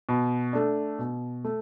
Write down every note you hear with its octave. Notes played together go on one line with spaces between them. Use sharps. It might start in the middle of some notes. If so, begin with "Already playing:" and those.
B2
A3 D4
B2
A3